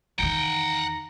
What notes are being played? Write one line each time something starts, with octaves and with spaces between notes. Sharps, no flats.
E2 D#3 F#5 G5 A#5